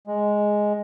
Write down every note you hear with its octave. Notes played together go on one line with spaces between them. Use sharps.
G#3